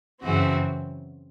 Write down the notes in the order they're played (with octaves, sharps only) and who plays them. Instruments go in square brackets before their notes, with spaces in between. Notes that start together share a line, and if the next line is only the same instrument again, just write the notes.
[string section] F#2 C#3 E3 C4 F#4